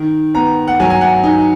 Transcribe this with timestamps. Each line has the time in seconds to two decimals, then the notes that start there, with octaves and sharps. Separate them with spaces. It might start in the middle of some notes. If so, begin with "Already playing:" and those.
Already playing: D#3
0.35 B3 A#5
0.67 F#5
0.80 F#3 G#5
0.90 G#5
1.01 F#5
1.24 D#4 G#5